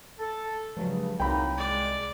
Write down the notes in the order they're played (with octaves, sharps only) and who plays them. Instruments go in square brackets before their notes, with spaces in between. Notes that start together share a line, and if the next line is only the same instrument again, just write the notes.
[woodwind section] A4
[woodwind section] G2 C#3 [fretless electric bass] F3 F#3 G#3
[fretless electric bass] C2 [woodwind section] F#3 A#3 D#4 [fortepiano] G5 B5
[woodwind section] G#3 [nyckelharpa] D5